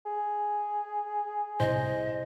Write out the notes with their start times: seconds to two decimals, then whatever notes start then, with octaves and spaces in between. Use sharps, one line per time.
0.06 G#4
1.60 C2 C5 D#5